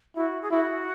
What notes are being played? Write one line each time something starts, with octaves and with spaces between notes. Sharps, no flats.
E4 F#4
G#4
E4 F#4